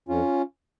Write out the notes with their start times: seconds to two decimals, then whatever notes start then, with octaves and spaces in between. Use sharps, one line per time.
0.08 F2 C#4 F4